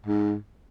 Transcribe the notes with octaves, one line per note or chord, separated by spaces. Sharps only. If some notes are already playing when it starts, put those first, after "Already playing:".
G#2